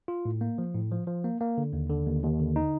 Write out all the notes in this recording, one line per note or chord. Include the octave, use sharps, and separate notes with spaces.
F4
A2
A#3
F3
A2
F3
F3
A#3
A#3
D3
D#2
D3
D#2
D#2
D3
D#4